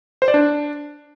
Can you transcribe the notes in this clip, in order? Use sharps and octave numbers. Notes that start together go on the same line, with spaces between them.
C5
D5
D4